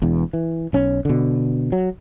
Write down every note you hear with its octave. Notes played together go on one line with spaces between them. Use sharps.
E1 E2
E3
B1 C#4
B2 D3
F#3